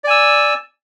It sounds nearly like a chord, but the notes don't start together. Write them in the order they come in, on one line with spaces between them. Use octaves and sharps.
D5 G#5 E6